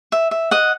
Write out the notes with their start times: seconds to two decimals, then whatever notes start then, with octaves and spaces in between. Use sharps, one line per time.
0.12 E5
0.31 E5
0.51 D#5 F#5